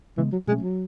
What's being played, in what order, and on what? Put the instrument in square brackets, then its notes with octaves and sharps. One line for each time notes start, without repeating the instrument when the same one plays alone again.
[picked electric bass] C#3 G#3 B3 [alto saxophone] E3
[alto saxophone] F#3
[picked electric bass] B2 F#3 A3 C#4 [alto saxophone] G#3
[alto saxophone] F#3